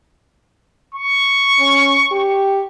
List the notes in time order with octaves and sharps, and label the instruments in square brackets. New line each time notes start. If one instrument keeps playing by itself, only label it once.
[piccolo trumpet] C#6
[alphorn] C#4
G4